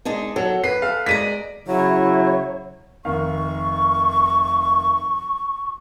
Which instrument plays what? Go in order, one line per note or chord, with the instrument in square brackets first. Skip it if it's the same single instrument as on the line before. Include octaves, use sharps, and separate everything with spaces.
[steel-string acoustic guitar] G#3 D4 D#4
[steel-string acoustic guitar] F#3 [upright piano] A4
[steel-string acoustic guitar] B4 [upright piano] C7
[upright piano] A4 F5
[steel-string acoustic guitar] G#3 D5 A#5 [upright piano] B6 D#7
[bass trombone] C#3 [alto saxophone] F#3 [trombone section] E4 [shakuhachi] C#5
[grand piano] F1 D#3 F5 [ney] C#6